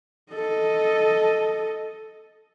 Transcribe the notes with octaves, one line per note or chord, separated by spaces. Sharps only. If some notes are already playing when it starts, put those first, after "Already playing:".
A4 D#5